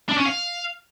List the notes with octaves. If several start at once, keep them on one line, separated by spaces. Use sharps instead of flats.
D4
C#4
F5